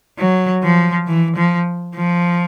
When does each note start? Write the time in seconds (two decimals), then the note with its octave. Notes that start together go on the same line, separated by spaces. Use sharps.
0.19 F#3
0.62 F3
1.07 E3
1.36 F3
1.96 F3